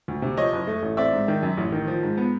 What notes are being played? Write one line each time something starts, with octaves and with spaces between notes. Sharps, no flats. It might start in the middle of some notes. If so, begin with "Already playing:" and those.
D2
C3
F3 C#5 D#5
F#1
A3
A1
C4 D5 E5
G#2
D#3
F#2
A1
D#3
F3
G#2
B3